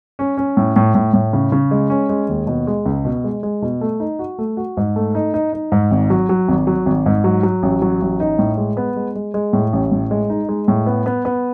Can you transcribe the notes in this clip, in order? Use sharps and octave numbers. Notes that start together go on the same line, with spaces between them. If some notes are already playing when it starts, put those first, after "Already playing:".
C#4
C#4
A2
A2
A2
A2
C#3
C#3
G#3
C#4
G#3
D#2
B2
G#3
C#2
B2
G#3
G#3
B2
A3
D#4
F#4
A3
F#4
G#2
A3
D#4
D#4
D#4
G#2
G#1
F#3
F#3
G#1
F#3
G#1
G#2
F#3
F#3
A1
F#3
A1
D#4
A2
G#3
B3
G#3
G#3
G#3
A2
A1
A2
G#3
D#4
G#3
A2
B3
B3
B3